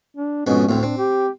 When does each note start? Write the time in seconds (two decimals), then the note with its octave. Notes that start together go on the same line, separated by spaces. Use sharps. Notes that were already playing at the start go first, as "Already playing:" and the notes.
0.17 D4
0.47 F2 G#2 B2 C#4
0.69 D2 A2 C4
0.83 C4 D4
0.98 G4